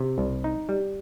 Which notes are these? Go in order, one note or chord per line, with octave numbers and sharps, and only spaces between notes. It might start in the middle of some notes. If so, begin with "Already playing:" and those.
Already playing: C3
C2
D#4
G3